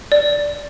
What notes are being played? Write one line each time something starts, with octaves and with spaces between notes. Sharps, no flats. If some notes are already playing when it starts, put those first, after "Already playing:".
D5